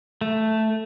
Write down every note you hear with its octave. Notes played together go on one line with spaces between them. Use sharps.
A3